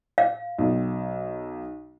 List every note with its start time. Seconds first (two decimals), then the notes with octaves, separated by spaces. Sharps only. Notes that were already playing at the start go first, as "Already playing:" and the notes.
0.18 F5
0.58 B1